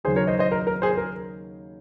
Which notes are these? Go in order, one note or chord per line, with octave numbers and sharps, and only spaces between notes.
D#2 C#3 F#3 G#4 C5
A#4 C#5
C5 D#5
C5 D#5
A#4
A#4
G#4 C5
A#4